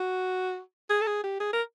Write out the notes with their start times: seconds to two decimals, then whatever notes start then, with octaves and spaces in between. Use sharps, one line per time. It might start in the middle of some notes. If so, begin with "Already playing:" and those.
Already playing: F#4
0.90 G#4
1.01 A4
1.07 G#4
1.24 G4
1.40 G#4
1.53 A#4